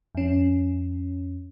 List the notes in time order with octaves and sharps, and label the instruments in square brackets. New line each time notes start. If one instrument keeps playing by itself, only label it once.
[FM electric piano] F2 C#4